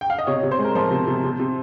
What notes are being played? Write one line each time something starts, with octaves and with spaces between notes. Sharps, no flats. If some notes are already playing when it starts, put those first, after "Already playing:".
G5
F5
D#5
C3 C#5
C3
C5
G#3
A#4
F3 C5
C3
C3
C3
C3